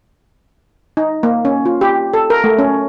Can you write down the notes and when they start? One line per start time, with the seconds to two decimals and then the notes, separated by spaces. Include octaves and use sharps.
0.97 D#4
1.23 A#3
1.45 C#4
1.65 F4
1.81 G4
2.14 A4
2.30 A#4
2.44 A3
2.59 C#4